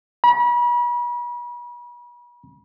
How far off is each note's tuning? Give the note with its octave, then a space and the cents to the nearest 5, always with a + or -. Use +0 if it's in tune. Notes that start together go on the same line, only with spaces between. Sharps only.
B5 -40